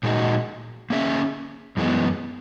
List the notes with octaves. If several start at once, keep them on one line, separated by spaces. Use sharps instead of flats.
A#2 G#3 D#4 F#4
A#3 C#4 G#4 C#5 E5
F#2 E3 G#3 B3